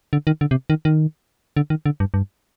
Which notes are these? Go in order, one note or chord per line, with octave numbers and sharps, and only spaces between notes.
D3
D#3
D3
C3
D#3
D#3
D3
D#3
D3
G2
G2